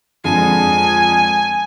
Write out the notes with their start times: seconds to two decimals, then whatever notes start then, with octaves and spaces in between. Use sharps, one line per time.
0.24 F2 D3 G#3 G#5